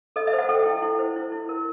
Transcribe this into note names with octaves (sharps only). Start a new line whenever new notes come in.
A4 D#5
E5
C5
F#5
A4 G5
E4
E4
C5
E4
E4
A#4